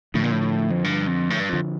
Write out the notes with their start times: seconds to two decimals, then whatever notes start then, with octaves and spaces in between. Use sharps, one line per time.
0.14 A2 D3 F3
0.24 A#2
0.31 A2
0.71 F2
0.84 G2
1.07 F2
1.30 A2
1.40 G2
1.49 F2 D3 F3